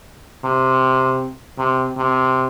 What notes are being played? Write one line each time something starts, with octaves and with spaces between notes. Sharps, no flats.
C3
C3
C3